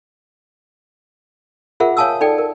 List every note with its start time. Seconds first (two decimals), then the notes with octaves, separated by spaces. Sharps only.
1.80 F4 G#4 A#4 C5 E5 F#5
1.97 C#5 F5 G#5 A5 D#6 E6
2.21 D#4 A4 D5 G5
2.38 A#4